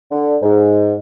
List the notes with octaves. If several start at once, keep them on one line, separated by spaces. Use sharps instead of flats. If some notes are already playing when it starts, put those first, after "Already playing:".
D3
G#2